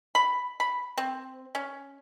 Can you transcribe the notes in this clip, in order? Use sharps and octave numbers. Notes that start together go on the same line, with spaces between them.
B5
B5
C4
C#4